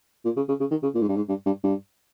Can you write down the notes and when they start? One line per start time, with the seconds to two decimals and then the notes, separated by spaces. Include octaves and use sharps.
0.25 A#2
0.36 C#3
0.48 C#3
0.60 C#3
0.71 D#3
0.83 C#3
0.95 A#2
1.01 G#2
1.09 G2
1.16 G#2
1.29 G2
1.46 G2
1.63 G2